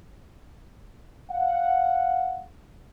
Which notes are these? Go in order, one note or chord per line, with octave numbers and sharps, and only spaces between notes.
F5 F#5